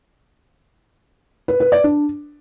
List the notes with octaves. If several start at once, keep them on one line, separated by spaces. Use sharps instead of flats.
B4
B4
D5
D4